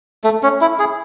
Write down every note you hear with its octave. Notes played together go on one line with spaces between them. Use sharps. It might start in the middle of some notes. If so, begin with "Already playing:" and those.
A3
C#4
E4
G#4